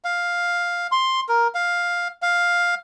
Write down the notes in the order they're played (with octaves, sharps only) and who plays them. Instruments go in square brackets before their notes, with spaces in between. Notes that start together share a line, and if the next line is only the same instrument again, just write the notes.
[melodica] F5
C6
A#4
F5
F5